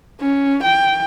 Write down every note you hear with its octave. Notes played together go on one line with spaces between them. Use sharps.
C#4
G5